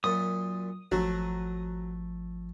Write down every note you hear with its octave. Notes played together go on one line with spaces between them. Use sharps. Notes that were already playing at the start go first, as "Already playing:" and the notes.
F#2 A#2 D#6
G#1 F3 F#3 A3